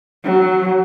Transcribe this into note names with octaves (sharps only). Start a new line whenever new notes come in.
F#3